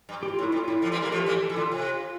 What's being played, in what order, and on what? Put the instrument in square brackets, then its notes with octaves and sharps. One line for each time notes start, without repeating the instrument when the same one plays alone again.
[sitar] G2
[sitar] G2 [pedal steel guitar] G4
[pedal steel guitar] F4
[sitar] A2
[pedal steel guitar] E4
[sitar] G2 [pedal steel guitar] F4
[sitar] A2 [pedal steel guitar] E4
[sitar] D3 F3 [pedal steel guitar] F4
[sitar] E3 G3
G3 A#3
[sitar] F3 A3 [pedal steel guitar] G4
[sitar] E3 G3
[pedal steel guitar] G4
A4
[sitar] E3
[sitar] D3 [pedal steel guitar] F4
[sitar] C3 [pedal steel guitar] F4